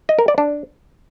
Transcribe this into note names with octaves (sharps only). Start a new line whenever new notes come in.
D#5
A#4
D5
D4